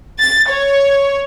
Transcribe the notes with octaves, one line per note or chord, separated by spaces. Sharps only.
A6
C#5